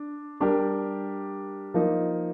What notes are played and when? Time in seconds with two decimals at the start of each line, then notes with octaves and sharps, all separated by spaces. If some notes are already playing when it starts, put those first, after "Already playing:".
Already playing: D4
0.40 G3 D4 G4 A#4
1.74 F3 A#3 D#4 A#4